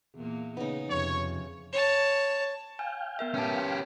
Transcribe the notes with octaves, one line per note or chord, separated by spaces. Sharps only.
E2 A#2 A#3
C#3 B3 D#4
F2 C3 C#5
C#5 A5
F5 G5 G#5
B3 A#4 E5
C#4 G4 B4 A5